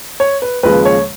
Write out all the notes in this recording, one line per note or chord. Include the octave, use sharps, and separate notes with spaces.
C#5
B4
D#2 C#3 F3 G#3 B4
C#5